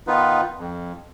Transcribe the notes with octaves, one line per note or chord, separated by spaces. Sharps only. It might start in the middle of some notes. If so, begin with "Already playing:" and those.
D#3 B3 D#4 F4 B4
F2